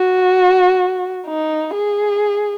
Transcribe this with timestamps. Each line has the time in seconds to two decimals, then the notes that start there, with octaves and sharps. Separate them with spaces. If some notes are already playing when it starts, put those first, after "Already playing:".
Already playing: F#4
1.27 D#4
1.74 G#4